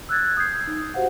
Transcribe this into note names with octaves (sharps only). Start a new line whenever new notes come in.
E6 F#6 G#6 A6
D#6 G6 G#6 C7
D#4
F#4 G4 C5 F5 F#5